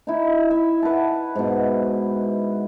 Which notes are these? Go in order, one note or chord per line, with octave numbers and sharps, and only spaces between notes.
D#4 E4
E5
B4 F#5 A5
G#2 B2